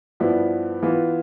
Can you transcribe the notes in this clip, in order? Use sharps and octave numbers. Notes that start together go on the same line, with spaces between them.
G2 F3 B3 E4
E3 B3 F4